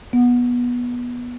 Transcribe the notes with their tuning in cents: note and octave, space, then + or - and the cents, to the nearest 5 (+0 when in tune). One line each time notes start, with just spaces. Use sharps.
B3 -20